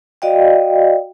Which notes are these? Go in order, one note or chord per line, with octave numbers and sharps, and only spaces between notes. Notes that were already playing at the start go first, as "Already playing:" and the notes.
F#4 D5 D#5 F5 G5